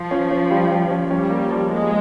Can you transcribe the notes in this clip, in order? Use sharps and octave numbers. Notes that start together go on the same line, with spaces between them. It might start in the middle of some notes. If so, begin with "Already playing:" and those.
Already playing: F3 F4
C#4
C#4
G3
G3
C#4
G3 C#4
A#3
F3
G#3 A#3